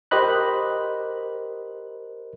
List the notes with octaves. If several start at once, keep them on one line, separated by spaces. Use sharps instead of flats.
G4 A#4 C5 D#5 B5 F#6